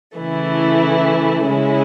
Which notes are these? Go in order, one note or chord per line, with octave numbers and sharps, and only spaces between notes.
C#3 E3 A3 E4
C#3 G#3 C#4 E4